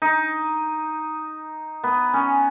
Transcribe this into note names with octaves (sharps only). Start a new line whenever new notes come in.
D#4
B3
C#4